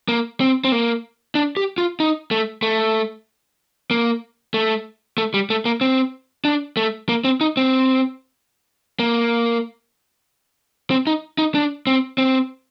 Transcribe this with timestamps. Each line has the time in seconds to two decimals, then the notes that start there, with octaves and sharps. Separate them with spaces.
0.08 A#3
0.40 C4
0.64 C4
0.72 A#3
1.35 D4
1.57 G4
1.78 F4
2.00 D#4
2.31 A3
2.62 A3
3.91 A#3
4.54 A3
5.18 A3
5.34 G3
5.50 A3
5.65 A#3
5.81 C4
6.45 D4
6.77 A3
7.09 A#3
7.24 C4
7.41 D#4
7.57 C4
8.99 A#3
10.90 C4
11.07 D#4
11.38 D#4
11.55 D4
11.87 C4
12.18 C4